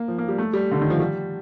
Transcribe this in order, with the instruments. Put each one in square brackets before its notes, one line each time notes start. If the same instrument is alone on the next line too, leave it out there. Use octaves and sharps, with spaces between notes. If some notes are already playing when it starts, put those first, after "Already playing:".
Already playing: [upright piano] A#3
F3
A#3
G3
A3
G3
D3
D#3
F3
G3